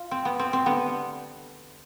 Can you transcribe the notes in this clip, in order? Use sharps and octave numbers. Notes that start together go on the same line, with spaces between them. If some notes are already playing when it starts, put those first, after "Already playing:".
Already playing: F4
C4
B3
C4
C4
D3 G3 B3